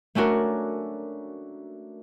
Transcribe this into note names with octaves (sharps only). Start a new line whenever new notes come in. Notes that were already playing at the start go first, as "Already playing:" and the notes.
A3 C#4 D4 F#4 A#4